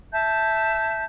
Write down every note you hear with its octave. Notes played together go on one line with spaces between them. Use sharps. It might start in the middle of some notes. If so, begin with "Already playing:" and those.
E5 A5 G6